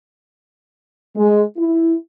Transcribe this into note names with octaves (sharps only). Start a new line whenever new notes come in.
G#3
E4